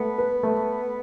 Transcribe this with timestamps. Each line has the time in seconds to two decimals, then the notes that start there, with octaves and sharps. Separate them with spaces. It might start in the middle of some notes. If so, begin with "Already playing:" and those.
Already playing: A3 B3
0.18 B4
0.43 A3